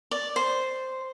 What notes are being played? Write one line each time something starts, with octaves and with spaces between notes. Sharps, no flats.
D5
C5